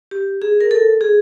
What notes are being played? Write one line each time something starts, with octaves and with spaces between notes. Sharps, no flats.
G4
G#4
A#4
A4
G#4